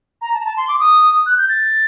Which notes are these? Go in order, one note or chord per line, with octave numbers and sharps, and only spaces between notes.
A#5
A5
A#5
A5
C6
D6
D#6
F#6
G6
A6